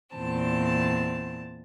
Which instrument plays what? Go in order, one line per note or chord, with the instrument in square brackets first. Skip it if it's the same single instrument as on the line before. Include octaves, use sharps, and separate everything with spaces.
[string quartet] E2 A#2 C4 A5